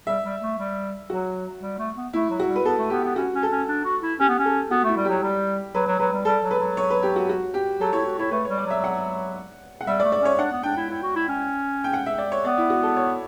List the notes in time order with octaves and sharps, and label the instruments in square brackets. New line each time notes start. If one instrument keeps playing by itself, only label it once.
[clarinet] G3 [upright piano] E5
[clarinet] G3
A3
G3
[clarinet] F#3 [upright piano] F#4
[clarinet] G3
A3
B3
[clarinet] A3 [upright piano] E4
[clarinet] F#3
[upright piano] F#4
[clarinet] G3
[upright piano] B4
[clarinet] B3 [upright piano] A4
[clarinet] A3
[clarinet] B3 [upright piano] G4
[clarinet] B3
[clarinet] C#4 [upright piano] F#4
[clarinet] C#4
[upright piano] A4
[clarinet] C#4
D4
F#4
E4
[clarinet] C#4 [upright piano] G4
[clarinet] B3
C#4
[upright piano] A4
[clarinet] B3 [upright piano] F#4
[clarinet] A3
[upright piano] E4
[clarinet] G3
[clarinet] F#3 [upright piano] G4
[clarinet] G3
[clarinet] F#3 [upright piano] B4
[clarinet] F#3
[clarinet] F#3 [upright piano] B4
[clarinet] G3
[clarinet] G3 [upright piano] A4
[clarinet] F#3
[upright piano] B4
[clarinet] F#3
[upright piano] C#5
B4
G4
F#4
F#4
G4
[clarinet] F#3 [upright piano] A4
[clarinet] E4 [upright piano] C#5
[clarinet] F#4
[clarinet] E4 [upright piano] C#5
[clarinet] A3 [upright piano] B4
[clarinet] G3 [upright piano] C#5
[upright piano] D5
[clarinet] F#3 [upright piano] E5
[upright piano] F#5
F#5
[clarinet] G3 [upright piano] E5
[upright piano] D5
[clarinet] A3
[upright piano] D5
[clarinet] C#4 [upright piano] C#5
[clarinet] D4 [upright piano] F#5
[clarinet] B3
[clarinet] D4 [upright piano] G5
[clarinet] E4
E4
F#4
E4
C#4
[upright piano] G5
F#5
E5
D5
C#5
[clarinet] B3 [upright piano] D5
[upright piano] E4
F#4
A4
C#5